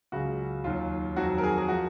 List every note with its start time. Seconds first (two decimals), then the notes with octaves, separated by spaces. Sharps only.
0.12 C#2 C#3 F#3 F#4
0.64 D#2 D#3 F#3 F4
1.16 F2 D#3 F#3 F#4
1.38 A#4
1.43 G#4
1.58 G#4
1.69 F3 F#4